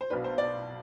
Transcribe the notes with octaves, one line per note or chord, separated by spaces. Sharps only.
C5
B1 B2 B3 D4 B4
C5
D5